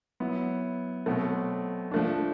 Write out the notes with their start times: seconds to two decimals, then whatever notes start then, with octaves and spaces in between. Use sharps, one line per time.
0.20 F#3 B3 E4
1.06 B2 F#3 A3 C4
1.91 F3 A3 D4